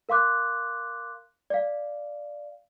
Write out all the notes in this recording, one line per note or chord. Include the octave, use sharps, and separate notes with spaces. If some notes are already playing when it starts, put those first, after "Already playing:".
A#4 F5 C6 D6 F#6
D5 F5